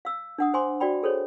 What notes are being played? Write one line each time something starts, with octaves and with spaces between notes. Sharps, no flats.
F5 E6
D4 F#5 D#6
C5 G#5 C6 D6
F#4 D5 G5 B5
G#4 A4 C5 C#5